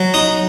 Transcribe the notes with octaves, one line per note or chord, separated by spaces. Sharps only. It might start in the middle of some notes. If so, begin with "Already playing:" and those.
Already playing: F#3
D#4 D#6